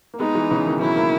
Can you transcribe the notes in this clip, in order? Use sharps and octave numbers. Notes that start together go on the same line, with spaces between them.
A#3
G#3 B3 D#4
E3 G#3
C#3 E3
B2 D#3
D#3 F#3 E4
F#3 A#3